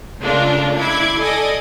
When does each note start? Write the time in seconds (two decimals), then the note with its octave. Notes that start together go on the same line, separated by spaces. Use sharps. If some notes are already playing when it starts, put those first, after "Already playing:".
0.21 C#3 G#3 A3 D4 F4 A#4
0.76 E4 D6 G#6 C7
1.20 A4 D5 D#5 G#5 D6 D#6